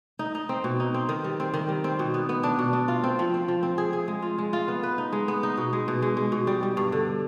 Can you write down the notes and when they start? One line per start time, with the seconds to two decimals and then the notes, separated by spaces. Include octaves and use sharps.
0.19 D#4
0.35 D#4
0.49 C4
0.64 B2
0.80 D#4
0.94 C4
1.09 D#3
1.24 G3
1.40 C4
1.54 D#3
1.69 G3
1.84 C4
1.99 B2
2.14 B3
2.29 B3
2.43 D4
2.59 B2
2.73 D4
2.88 F4
3.04 C4
3.19 F3
3.34 C4
3.48 F3
3.63 C4
3.78 G#4
3.93 G#4
4.08 G#3
4.22 F4
4.38 G#3
4.53 F4
4.68 B3
4.83 B4
4.98 D#4
5.12 G#3
5.28 B3
5.43 D#4
5.57 B2
5.73 G#3
5.88 B2
6.02 G#3
6.17 G#3
6.32 B2
6.47 G3
6.63 G3
6.77 G2
6.92 D3